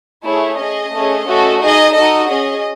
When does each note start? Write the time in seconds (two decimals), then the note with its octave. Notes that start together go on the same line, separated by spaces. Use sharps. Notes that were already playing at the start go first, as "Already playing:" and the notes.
0.24 A3 E4 G#4 C#5
0.59 C#4 G#4 D#5
0.93 A3 C#4 G#4
1.27 A3 C#4 F#4 A4
1.60 D#4 G#4 D#5
1.94 D#4 F#4 A4 D#5
2.28 C#4 G#4 D#5